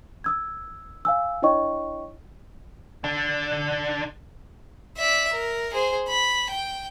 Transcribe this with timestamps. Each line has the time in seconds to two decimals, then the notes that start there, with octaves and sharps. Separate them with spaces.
0.24 D#6 E6 G#6
1.05 F5 G#5 E6
1.42 D4 E4 C#5 D#5 G5 C#6
3.04 D3 D4
4.98 D5 E5
5.33 A#4
5.73 G#4 C5
6.08 B5
6.50 G5